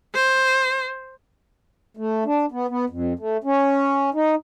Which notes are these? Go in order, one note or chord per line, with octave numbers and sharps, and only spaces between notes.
C5
A3
D4
B3
B3
F2
A3
C#4
D#4